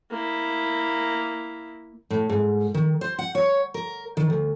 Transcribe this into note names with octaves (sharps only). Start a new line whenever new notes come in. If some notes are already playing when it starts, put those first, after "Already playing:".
A#3 E4
A2
G#2
D#3
C5
F#5
C#5
A#4
D#3
D2